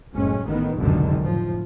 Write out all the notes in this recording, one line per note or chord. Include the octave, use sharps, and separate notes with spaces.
F#1 A2 G#3 C#4
A1 A2 D#3 B3
F1 C#2 F#2 B2 D3 D#3
A2 F3